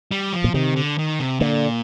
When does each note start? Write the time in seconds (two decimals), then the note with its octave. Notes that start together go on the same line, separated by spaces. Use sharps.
0.11 G3
0.33 F3
0.44 A#2
0.54 C3 D#3
0.76 D3
0.98 D#3
1.20 C3
1.40 A#2 D3